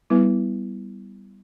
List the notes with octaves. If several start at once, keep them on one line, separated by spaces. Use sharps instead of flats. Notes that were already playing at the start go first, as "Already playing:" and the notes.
G3 B3 E4 B4